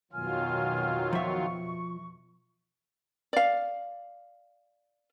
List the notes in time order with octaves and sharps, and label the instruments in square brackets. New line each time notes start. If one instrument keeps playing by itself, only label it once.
[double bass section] F2 B2 [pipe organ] D#3 F#3 F4 [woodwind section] G#5 F6
[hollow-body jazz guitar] F3 E5 [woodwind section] C#6
[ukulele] D5 F5